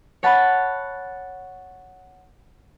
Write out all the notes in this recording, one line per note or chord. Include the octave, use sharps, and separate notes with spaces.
C#5 F#5 A5 B5 F#6